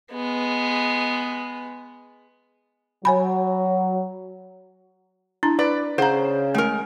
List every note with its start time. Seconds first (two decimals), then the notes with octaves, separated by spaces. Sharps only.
0.12 G#3 B3
3.05 F#3 C#5 G#5 B5
5.43 D4 E4 A#5
5.59 B4 D5
5.98 C#3 C5 F#5 A#5
6.54 G#3 A3 A#4